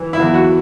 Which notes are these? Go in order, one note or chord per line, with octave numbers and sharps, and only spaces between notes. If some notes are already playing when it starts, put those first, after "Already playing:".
Already playing: E3
E4
E2
F#4